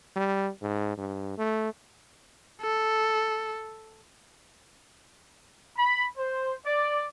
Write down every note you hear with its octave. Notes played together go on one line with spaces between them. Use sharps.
G3
G#2
G2
A3
A4
B5
C5
D5